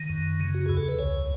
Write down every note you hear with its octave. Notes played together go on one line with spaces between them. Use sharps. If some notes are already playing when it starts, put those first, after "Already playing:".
Already playing: D#3
F#2
C#3
F#4
E2 G#4
A4
B4
C#2 C#5